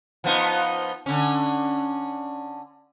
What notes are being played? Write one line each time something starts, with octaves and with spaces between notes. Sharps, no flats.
F3 B3 D#4
D3 C#4